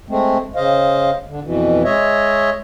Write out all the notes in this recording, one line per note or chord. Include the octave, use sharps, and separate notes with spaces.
G#3 A3 C4
C#3 C5 D#5 F5
D3
F2 B2 E3
G#3 C#5 D#5 E5